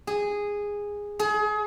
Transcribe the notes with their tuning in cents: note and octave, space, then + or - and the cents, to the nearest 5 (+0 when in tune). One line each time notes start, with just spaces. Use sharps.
G#4 -10
G#4 +30